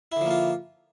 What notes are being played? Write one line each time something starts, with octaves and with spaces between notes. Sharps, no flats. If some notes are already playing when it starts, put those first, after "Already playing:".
D3 F3 A#3 E4 F4